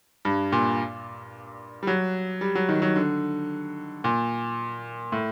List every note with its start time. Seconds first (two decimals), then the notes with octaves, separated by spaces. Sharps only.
0.25 G2
0.52 A#2
1.83 G3
1.87 F#3
2.41 G3
2.55 F#3
2.69 D#3
2.82 F#3
2.96 D3
4.04 A#2
5.12 A2